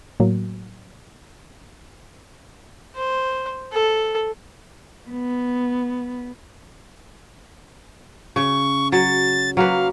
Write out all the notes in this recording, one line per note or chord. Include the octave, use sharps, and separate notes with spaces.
A2 F#3 A#3
C5
A4
B3
C#3 C#6
F#3 A6
F#3 A#3 B4 F5